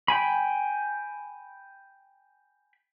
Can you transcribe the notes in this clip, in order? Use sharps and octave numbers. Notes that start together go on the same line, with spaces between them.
G5 G#5 B5